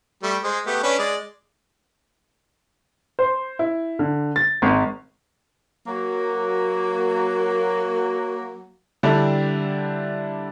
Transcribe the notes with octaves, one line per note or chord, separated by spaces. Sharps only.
G3 A3
G#3 C5
A3 B3 G4
C#4 D4 B4
G#3 D5
C5
E4
D3
A6
G#1
F#3 A#3
D3 G3 D4 E4